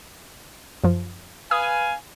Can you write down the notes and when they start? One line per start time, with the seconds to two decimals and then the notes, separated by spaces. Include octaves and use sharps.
0.84 F#2 F3
1.51 B4 F5 G#5 D#6